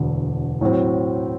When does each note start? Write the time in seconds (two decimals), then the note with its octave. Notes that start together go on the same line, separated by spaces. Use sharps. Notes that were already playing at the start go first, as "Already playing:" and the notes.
Already playing: E1 D2 D3
0.61 A2 F#3 C4